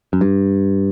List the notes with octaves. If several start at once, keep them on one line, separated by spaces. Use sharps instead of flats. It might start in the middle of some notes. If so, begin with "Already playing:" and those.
F#2
G2